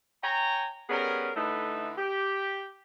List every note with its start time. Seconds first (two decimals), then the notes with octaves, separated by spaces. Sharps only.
0.23 C#5 G5 G#5 A#5
0.90 G3 B3 C#4 G#4 A#4
1.36 D3 A3 D#4 E4 B4
1.98 G4